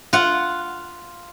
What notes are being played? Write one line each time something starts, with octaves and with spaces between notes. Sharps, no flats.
F4 F#5